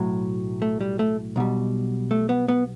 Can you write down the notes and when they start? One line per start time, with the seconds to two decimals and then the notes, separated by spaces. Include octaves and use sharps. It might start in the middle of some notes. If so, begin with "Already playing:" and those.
Already playing: B1 A2 F#3
0.62 A3
0.81 G3
0.99 A3
1.36 B1 B2 G3
2.11 A3
2.29 B3
2.48 B3